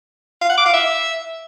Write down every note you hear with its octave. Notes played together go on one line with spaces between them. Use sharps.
F5
F#5
D6
F5
E5